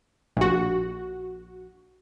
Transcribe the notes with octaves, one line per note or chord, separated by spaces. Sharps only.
A#1 F#4